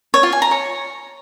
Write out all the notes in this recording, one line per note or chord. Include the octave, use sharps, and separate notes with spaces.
C#5
F4
G#5
A#5
C#5